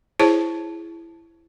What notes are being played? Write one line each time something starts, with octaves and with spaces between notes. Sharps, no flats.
E4 G#4 C5 C#5 A5